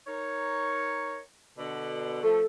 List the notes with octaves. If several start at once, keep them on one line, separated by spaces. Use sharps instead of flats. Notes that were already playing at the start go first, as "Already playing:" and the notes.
D#4 A#4 C#5
B2 D3
F3 A3 A4